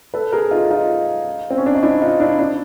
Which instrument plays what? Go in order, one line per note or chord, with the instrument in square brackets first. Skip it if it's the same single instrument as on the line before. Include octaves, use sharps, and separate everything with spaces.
[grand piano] A4 B4
G#4 A#4
D#4 F4
D#4 F4
C4
C#4
D4
D#4
D4 E4
D#4 F4
D4 E4
D4 E4